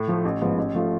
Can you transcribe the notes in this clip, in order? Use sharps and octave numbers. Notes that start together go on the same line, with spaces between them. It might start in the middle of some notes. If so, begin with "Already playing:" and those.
Already playing: A2
F3 A3
A1
G#2 F3 B3
A1
F3 A3 F4